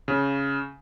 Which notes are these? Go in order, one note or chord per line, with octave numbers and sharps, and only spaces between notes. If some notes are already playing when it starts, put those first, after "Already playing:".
C#3